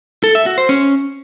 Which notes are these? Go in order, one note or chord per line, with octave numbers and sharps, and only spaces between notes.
A4
E5
F#4
C5
C#4